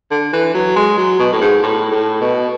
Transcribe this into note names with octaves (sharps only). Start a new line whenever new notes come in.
D3
E3
F#3
G#3
F#3
B2
A2
G#2
A2
A2
B2